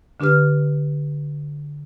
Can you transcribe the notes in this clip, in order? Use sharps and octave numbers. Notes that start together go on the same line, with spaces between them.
D3 D4 G4 B4 F6